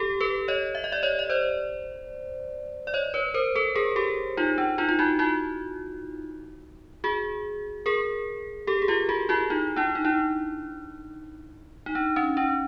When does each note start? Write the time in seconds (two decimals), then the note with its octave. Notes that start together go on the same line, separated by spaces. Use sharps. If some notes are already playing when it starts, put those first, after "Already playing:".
Already playing: G4 A4
0.20 A4 B4
0.48 C#5 D#5
0.75 E5
0.84 D#5
0.92 D5 E5
1.03 C#5 D#5
1.19 D#5
1.30 C5 D5
2.87 D5
2.94 C#5 D#5
3.14 B4 C#5
3.34 A#4 C5
3.56 A4 B4
3.75 G#4 A#4
3.96 G4 A4
4.37 D#4 F4
4.58 D4
4.78 D#4 F4
4.89 F4
4.99 E4 F#4
5.19 E4 F#4
7.04 F#4 G#4
7.86 G#4 A#4
8.67 G4 A4
8.82 G#4
8.88 F4 G4
9.09 F#4 G#4
9.29 E4 F#4
9.50 D#4 F4
9.76 D4 E4
9.95 D#4
10.05 D4 E4
11.86 D#4
11.95 D4
12.16 C#4
12.37 D4